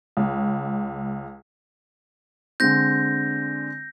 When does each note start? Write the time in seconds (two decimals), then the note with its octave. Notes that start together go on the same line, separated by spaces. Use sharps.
0.17 C#2
2.60 D3 G#3 C4 G6 A#6